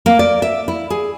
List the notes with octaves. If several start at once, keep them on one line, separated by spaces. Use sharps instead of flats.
A#3
D5
E5
E4
G#4